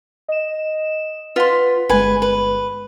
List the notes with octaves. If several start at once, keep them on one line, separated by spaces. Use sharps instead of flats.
D#5 E7
F4 B4 F#5 C6 B6
G1 G#3 B4 G#5
B4